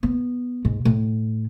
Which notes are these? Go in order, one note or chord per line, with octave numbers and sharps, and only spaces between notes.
B3
G#2
A2